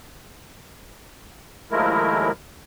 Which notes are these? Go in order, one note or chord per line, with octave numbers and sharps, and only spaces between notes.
D#2 F3 G#3 A3 E4 A#4